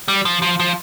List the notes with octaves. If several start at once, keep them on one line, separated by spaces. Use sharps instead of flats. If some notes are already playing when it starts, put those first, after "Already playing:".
G3
F3
F3
F3